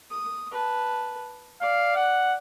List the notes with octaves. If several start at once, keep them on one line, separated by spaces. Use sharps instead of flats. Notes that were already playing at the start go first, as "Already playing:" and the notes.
D#6
B4 A5
D5 F5
F#5